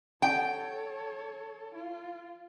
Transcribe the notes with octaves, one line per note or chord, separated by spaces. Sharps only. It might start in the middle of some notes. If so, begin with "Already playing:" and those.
A4 C#5 G5
F4